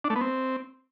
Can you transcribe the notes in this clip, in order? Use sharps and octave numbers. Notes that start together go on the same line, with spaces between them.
D4
A3
B3
C4